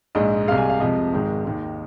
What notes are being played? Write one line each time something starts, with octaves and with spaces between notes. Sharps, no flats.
A#1 G#2 G#3 D#5
C2 C3 G#3 F5
G#5
F5
F2 C3 F3 G#3 D#5
G#1 G#2 D#3 G#3
D#2 D#3 G#3